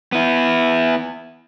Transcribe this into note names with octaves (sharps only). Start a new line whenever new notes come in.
B3 E4